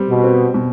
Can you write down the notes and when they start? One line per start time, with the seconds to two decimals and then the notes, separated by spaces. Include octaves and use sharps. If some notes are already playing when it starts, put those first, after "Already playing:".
Already playing: G3 C4
0.09 B2
0.24 C4
0.54 B2